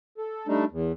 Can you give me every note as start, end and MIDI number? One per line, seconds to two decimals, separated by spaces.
0.18 0.47 69
0.48 0.65 55
0.48 0.65 57
0.48 0.65 62
0.48 0.65 63
0.71 0.92 40